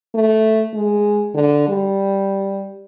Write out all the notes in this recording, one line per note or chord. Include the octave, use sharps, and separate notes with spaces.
A3
G#3
D3
G3